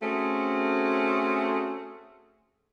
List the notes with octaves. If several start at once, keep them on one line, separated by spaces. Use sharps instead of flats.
A3 C4 C#4 F#4 G#4